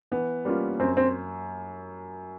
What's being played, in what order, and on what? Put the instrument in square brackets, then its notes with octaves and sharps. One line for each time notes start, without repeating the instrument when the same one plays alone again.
[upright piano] E3 [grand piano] B3
[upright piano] G3 A#3 C#4 F4
[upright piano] F#2 [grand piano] C4
[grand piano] C4